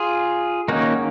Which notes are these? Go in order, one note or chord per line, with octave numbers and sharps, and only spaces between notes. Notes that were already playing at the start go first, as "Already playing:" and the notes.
Already playing: F4 G#4
D#3 A#3 C#4 D#4 F#4